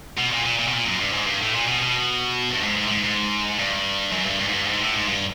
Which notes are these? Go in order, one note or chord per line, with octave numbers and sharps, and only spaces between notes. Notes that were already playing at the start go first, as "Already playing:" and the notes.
B2
A#2
A#2
A#2
B2
A#2
F#2
G2
G#2
G2
A2
A#2
B2
B2
G2
G#2
G#2
A2
G#2
G#2
G2
F#2
G2
G2
G#2
G2
G#2
A2
G#2
G2